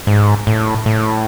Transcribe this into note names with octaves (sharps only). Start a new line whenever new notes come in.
G#2
A2
A2